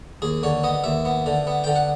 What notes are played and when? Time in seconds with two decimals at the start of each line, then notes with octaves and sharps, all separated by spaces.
0.22 D#2 G#4
0.43 D3 C#5
0.64 B3 D#5
0.84 D#2 E5
1.05 B3
1.26 D3
1.47 B3
1.64 D3 G5
1.76 F#5